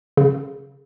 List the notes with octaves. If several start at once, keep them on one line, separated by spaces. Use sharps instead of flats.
C#3